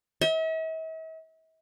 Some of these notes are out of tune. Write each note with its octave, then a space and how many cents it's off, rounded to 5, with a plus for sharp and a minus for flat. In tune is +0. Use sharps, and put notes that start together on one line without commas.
E5 -45